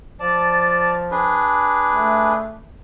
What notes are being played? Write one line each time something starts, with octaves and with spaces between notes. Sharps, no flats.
F3 D5 A5
D4 G#4 B4
A3